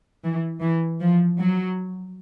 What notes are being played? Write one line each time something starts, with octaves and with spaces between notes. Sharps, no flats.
E3
E3
F3
F#3